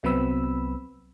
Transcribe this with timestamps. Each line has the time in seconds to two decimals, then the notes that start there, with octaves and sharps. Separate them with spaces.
0.03 C2 F#3 B3 C4 B5 E6